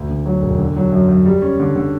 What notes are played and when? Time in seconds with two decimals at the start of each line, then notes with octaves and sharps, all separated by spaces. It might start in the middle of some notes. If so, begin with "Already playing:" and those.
Already playing: D2
0.09 D3
0.26 F#3
0.42 E1
0.59 D3
0.76 F#3
0.92 F#2
1.09 F#2
1.26 G3
1.42 C#4
1.60 D3
1.76 D3